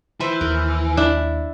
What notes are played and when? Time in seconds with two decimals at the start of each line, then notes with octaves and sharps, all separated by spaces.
0.20 E3 B4 C5 E5
0.41 D#2 A#4
0.97 D4 E4 E5